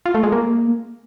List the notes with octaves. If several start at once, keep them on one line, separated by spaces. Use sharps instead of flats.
F4
A3
G#3
A#3